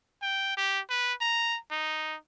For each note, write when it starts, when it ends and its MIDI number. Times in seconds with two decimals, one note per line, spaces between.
0.22 0.56 79
0.57 0.80 67
0.90 1.13 71
1.21 1.58 82
1.71 2.16 63